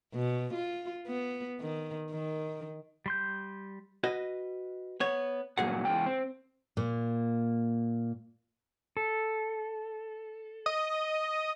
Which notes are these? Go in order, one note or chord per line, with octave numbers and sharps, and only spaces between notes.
B2
F4
B3
D#3
D#3
G3 C6 G6
F#4 B4 D#5
B3 C#5
C#2 G2 A#2 F#3 G#4 F#5
E2 A#3 G5
C4
A#2 A#3
A4
D#5